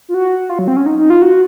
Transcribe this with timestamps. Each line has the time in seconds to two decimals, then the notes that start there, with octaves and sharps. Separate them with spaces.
0.09 F4
0.14 F#4
0.49 F4
0.59 F#3
0.68 C4
0.77 C#4
0.86 D#4
0.98 D#4
1.10 F4
1.22 F#4